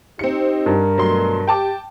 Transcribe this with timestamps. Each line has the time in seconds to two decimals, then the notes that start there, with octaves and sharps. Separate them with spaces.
0.19 C4 D#4 G4 C#7
0.66 G2 A#4
0.98 B2 F#3 A3 C6
1.47 G4 G5 A5 D6